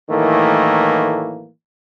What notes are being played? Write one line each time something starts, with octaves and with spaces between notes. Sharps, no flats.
A2 D#3 E3 F#3 A3 A#3